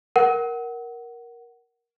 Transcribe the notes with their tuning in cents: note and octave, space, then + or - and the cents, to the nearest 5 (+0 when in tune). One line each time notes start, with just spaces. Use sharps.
A#4 +10 F#5 +15